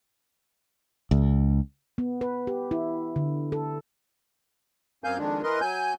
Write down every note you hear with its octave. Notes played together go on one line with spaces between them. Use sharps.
C#2
B3
B4
G4
E4
D3
A4
F#2 A#3 C4 F5 G#5 G6
F2 D#3 G#3 D4
E3 A#4 B4 D#5 C6
F#3 G#5 G6